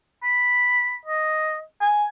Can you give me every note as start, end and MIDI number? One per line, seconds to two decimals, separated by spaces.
0.23 0.96 83
1.05 1.60 75
1.81 2.05 80